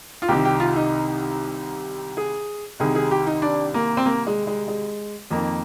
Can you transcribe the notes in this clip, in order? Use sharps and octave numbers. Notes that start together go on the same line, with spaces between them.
F4
C2 C3 D#3 G4
G4
F4
D#4
G#4
C2 C3 D#3 G#4
G#4
G4
D#4
D4
A#3
C4
A#3
G#3
G#3
G#3
F2 D#3 A#3